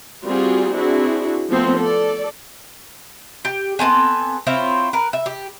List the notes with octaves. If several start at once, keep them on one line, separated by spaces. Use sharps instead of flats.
G3 C4 F4 F#4 G#4
C4 D4 E4 F#4 G#4
F3 A3 B3 C4 C5
A4 D5
G4
B3 C4 A4 G#5
C4 E4 F4 C#5
A#4 B4
E5
G4